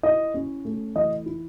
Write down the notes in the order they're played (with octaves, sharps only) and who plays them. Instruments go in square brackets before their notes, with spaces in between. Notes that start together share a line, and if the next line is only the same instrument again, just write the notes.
[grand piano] E4 D#5
C#4
A3
E3 D#5
E4